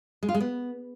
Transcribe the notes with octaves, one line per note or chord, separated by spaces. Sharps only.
G#3
F4
G#3
B3